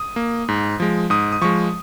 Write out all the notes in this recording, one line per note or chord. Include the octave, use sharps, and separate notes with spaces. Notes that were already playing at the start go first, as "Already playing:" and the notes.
Already playing: D#6
A#3
G#2
F3 G#3
G#2 D#6
D#6
F3 G#3 C#6